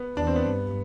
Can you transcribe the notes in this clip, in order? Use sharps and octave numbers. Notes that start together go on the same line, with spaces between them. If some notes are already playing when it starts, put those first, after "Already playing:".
Already playing: B3
E2 D4
C4
B3
G2